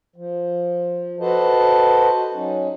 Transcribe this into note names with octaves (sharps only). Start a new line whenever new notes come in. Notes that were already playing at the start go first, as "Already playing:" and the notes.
F3
F#4 A4 B4 C5 D#5 A5
F#3 C#4 D#4